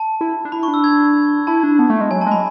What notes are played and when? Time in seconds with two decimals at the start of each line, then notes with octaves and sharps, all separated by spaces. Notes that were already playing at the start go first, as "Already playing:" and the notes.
Already playing: A5
0.21 E4
0.45 D4
0.52 E4 B5
0.63 C#6
0.68 D4
0.74 E6
0.84 G#6
1.47 E4 A5
1.63 D4
1.79 B3
1.90 A3
2.01 G#3
2.11 F#3 G#5
2.21 A5
2.26 G#3
2.32 B5